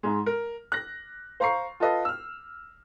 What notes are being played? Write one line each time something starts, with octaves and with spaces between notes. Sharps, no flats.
G#2 G#3
A#4
F#6 A#6
C5 F5 A#5 C#6 C7
F4 A4 B4 D#5
E6 F6